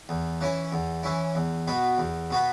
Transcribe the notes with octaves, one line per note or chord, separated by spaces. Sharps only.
E2
E3 C#4 E4
E2
E3 C#4 E4
E2
B2 B3 F#4 B4
E2
B2 B3 F#4 B4